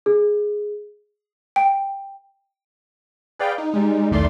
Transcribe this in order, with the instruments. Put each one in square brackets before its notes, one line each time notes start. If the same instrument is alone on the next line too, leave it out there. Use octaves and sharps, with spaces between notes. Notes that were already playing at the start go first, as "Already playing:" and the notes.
[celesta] G#4
[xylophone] G5
[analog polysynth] G#4 B4 D5 F5 G5
D#4
G3 G#3 D#4
B1 E2 D#3 A3 D5 C6